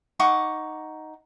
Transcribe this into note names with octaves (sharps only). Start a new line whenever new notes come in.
D#4 F#5 C#6 D6